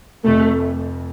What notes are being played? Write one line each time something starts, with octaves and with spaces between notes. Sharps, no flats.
F1 F2 C3 A3